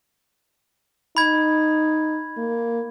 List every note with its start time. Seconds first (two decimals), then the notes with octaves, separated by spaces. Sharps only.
1.17 D#4 B5 G#6
2.37 A#3